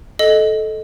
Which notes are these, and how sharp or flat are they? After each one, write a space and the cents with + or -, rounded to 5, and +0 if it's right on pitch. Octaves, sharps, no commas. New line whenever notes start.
A4 -15 D#5 +0